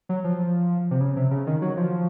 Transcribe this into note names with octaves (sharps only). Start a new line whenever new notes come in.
F#3
F3
C3
C#3
C3
C#3
D#3
F#3
F3